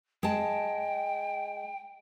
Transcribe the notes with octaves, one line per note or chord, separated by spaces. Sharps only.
G#3 G5 A5